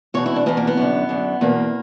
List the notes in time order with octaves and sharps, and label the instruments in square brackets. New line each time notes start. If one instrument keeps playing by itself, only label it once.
[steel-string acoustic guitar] E2 B2 C#5
E4
D4
E2 B2 B3
A#3
B3
F#2 D3
F#2 D3
E2 B2 A#3